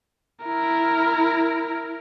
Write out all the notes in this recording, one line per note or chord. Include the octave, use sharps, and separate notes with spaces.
E4 A#4